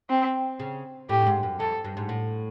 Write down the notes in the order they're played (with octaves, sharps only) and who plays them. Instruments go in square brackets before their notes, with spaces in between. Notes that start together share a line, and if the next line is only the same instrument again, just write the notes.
[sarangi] C4
[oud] C#3
[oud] A2 [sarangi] G4
[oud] G2
G#2
F#2
[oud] F2 [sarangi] A4
[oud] G2
G#2
A2